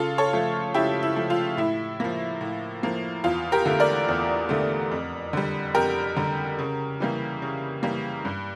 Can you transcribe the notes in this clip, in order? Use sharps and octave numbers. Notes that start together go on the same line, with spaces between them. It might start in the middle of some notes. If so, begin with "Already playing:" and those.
Already playing: C#3 F4 A4
A4 C#5
F3 A3
C#3 E4 G4
E4
F3 A3
F4
A2 E4
F3 A#3
A2
F3 A#3
E2 F4
G4 A#4
D3 A3
A#4 D5
E2
D3 A3
F2
D3 G3
F2 G4 A#4
D3 G3
C#3
E3 G3 A#3
C#3
E3 G3 A#3
G2